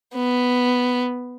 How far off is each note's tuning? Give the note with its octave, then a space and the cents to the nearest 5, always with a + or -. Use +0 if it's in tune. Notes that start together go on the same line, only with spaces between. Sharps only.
B3 +5